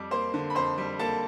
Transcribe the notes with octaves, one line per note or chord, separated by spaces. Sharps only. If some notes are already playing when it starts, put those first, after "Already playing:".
Already playing: F2 G3 D6
A#3 C5 C6
D3
B5
F2 C5 C6
G3
A#3 A4 A5